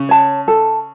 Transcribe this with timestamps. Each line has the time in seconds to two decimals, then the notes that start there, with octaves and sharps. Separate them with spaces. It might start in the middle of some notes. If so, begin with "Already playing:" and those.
Already playing: C#3
0.09 C#5 A5
0.48 A4